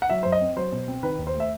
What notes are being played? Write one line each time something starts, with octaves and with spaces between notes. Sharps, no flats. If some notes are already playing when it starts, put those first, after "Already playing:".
F#5
F#3 E5
F#2 C5
D#5
C4
F#3 C5
B2
C4
D#3 B4
D#2
C5
A3
E5